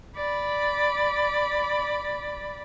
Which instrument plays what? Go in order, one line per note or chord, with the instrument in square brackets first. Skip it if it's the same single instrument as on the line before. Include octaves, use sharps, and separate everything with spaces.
[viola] D5 B5